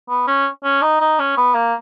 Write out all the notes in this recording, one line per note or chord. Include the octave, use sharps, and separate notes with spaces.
B3
C#4
C#4
D#4
D#4
C#4
B3
A#3